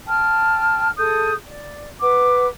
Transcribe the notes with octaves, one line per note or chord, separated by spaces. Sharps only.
G5 A5 F6
G#4 A4 D#6 G6
D5
B4 F#5 D6